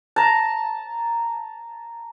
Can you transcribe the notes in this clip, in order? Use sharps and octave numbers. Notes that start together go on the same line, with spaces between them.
A5 A#5